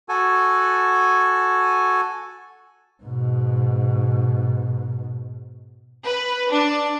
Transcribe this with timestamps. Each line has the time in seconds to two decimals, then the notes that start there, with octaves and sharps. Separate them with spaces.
0.09 F#4 A4 G#5
3.03 G#2 B2
6.05 B4
6.50 D4